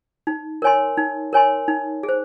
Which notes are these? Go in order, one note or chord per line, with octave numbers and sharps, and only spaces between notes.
D#4
A#4 C#5 G#5 C6
D#4
A#4 C#5 G#5 C6
D#4
G#4
C5